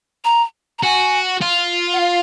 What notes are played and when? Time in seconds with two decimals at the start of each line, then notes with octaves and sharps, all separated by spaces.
0.25 A#5
0.79 A#5
0.83 F#4 G#5
1.41 F4
1.93 F#5
2.01 F5